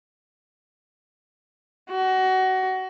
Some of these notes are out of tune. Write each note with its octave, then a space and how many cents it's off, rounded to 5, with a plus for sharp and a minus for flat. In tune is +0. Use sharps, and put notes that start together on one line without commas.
F#4 +25